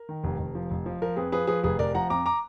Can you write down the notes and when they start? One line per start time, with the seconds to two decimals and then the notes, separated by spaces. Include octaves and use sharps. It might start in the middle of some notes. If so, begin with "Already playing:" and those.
Already playing: A#4
0.09 D#3
0.24 F1
0.39 F1
0.55 F3
0.71 F1
0.86 F3
1.02 F3 A#4
1.16 F2 G#4 B4
1.32 F3 G#4 B4
1.47 F3 G#4 B4
1.63 F1 G#4 B4
1.79 F1 A#4 D5
1.95 F3 F#5 A#5
2.10 F2 A#5 D6
2.26 A#5 D6